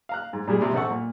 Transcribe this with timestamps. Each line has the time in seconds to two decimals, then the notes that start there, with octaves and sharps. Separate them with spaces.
0.09 F5 A#5 F#6
0.33 G#2
0.47 A#2 G3 G#3
0.62 C3
0.73 A#1 C4 A4 F#5 C#6
0.90 A#2